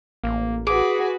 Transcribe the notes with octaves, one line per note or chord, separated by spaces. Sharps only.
A1 A#3
F#4 G#4 B4 D6